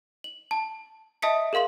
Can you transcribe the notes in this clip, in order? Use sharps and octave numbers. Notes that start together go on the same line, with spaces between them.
F#7
A5
D#5 E5 A5 D#6 B6 C#7
G#4 A#4 F5 C6 F#7